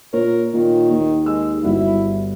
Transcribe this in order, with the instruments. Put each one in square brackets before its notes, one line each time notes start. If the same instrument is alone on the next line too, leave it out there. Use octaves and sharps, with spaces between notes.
[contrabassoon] A#2 [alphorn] A#4 [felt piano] C#5
[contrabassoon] A#2 [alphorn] D#3
[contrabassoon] D#2
[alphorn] G#3 [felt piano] E6
[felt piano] G1 G3 F#4 [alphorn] E4